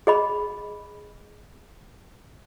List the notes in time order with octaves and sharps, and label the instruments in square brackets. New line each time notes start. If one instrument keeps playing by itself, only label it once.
[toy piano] G#4 D#5 B5